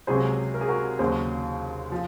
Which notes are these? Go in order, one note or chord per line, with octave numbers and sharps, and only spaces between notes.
C#2 C3 F#3 G#4 C5
A#4
G#4
F#4 A#4
D#2 C#3 F#3 G#4 C5
F3